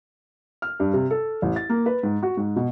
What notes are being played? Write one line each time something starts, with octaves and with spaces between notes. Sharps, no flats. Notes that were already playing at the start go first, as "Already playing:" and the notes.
F6
G2
C3
A4
A1
A6
A#3
B4
G#2
F#4
G#2
B2